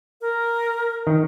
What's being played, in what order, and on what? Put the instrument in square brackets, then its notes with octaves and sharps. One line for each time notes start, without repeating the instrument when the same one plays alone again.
[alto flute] A#4
[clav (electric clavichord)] D#3